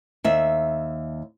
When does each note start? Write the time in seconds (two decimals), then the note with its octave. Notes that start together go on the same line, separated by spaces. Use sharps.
0.24 D#2 E5